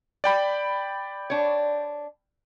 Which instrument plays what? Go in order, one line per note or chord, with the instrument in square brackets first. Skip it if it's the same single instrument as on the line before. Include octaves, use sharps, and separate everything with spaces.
[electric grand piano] D5 G5 B5
[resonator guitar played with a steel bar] D4 C#5